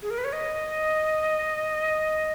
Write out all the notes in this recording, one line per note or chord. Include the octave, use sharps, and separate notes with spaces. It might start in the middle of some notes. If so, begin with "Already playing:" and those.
G#4
A#4
B4
C#5
D#5